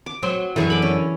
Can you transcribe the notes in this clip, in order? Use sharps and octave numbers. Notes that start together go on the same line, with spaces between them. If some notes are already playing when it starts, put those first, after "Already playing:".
D6
F#3 C4
F#2 D3 E3 G#4 C#6
B5 D6
C#4